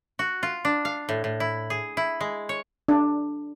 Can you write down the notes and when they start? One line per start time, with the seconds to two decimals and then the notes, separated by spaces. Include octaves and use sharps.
0.19 F#4
0.43 F4
0.65 D4
0.85 F5
1.09 A2
1.24 A2
1.40 E4
1.70 G#4
1.97 E4
2.21 G#3
2.49 C#5
2.88 D4